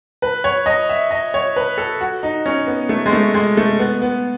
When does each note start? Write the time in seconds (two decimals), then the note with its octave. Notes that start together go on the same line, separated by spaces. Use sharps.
0.22 B4
0.44 C#5
0.66 D#5
0.89 E5
1.11 D#5
1.34 C#5
1.56 B4
1.78 A4
2.01 F#4
2.23 D#4
2.46 C#4
2.67 B3
2.89 A3
3.06 G#3
3.13 A3
3.34 G#3
3.57 A3
3.79 B3
4.02 B3